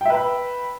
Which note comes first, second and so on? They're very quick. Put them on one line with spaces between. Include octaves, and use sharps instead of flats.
G5 E5 B4 B5